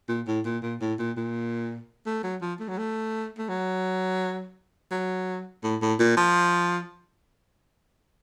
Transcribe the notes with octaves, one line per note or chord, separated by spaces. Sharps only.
A#2
A2
A#2
A#2
A2
A#2
A#2
A3
F#3
F3
A3
F#3
A3
A3
F#3
F#3
A2
A2
A#2
F3